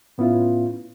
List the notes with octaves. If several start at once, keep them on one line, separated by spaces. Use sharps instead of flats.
A2 B3 C#4 E4 F4